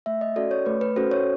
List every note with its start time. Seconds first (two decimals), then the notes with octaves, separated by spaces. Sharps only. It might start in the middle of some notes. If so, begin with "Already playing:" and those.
0.06 A3 E5
0.21 D#5
0.36 C#4 F#4 A4 D5
0.51 C#5
0.66 A3 B4
0.81 B4
0.96 C#4 F#4 A4 C5
1.11 C#5